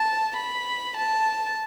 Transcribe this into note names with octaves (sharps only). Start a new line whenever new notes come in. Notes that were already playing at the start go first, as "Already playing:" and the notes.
Already playing: A5
B5
A5